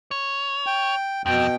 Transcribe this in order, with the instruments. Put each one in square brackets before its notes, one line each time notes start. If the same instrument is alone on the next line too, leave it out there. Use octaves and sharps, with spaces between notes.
[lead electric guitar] C#5
[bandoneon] G5
[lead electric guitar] F2 [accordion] B2 G5